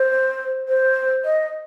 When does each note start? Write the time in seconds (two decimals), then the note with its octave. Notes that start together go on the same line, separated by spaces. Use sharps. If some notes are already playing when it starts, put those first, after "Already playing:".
Already playing: C5
0.68 C5
1.25 D#5